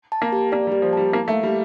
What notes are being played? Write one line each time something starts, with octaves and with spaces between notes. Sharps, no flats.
A5
A#3
G4
A#3 D5
G3
G4
F3
G3 A5
A#3 E4
A3
F5
G3